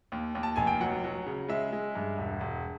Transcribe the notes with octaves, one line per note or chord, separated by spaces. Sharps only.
D#2
D#2
A5
F1 G#5
G5
F#3 F#5
F#3
C#3
G#3 E5
G#3
G2
E1
E1